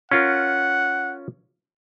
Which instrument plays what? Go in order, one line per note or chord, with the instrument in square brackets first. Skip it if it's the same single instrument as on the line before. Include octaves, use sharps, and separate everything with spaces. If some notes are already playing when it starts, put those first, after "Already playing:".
[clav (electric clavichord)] C#4 F4 A#4 [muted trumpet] F#5